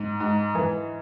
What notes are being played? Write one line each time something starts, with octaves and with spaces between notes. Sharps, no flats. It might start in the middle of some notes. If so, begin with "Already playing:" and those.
Already playing: G#2
G#2
E3